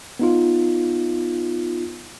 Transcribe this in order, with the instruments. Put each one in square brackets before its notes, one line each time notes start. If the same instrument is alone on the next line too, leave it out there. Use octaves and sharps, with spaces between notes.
[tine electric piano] B3 D#4 F4